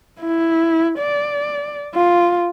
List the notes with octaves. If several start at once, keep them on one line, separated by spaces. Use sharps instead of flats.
E4
D5
F4